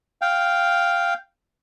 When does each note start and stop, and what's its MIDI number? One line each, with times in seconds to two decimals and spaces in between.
0.22 1.14 77
0.22 1.14 79